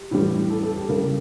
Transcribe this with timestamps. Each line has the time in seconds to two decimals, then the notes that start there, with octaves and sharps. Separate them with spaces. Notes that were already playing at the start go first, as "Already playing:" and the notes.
Already playing: G4
0.11 A2 E3 G3
0.50 A4
0.63 A4
0.76 G4
0.89 C#3 G3 A#4